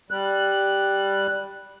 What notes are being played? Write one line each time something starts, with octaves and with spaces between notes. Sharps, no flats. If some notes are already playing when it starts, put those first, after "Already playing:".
G3 F#6